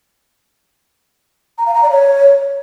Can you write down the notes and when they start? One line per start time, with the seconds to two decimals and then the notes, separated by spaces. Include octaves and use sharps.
1.58 A#5
1.66 F5
1.75 A#5
1.83 D5
1.91 C#5